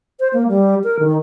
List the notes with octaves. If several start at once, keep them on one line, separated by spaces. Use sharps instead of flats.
C5
A#3
G3
A#4
D#3